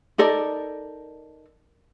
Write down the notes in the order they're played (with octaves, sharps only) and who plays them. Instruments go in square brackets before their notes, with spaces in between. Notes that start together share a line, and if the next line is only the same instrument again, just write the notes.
[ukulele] D#4 A4 A#4 D5